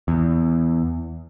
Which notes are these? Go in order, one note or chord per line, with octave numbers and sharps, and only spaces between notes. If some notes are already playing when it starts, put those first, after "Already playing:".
E2